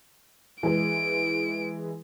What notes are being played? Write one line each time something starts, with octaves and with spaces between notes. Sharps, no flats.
E3 G#3 B4 D7